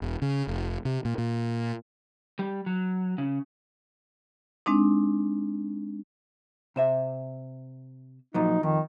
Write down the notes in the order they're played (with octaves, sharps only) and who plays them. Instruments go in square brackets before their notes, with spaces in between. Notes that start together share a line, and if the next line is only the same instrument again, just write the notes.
[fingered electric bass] E1
C#3
F1
C3
A#2
A#2
[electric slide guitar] G3
F#3
C#3
[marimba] G#3 C4 D4 D#4
[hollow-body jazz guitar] C3 C5 E5
[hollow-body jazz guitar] A#2 F3 F#3 [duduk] D#4
[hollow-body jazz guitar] F2 [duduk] D#3